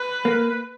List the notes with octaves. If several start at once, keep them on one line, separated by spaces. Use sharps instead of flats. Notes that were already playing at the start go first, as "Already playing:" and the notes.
Already playing: B4
A#3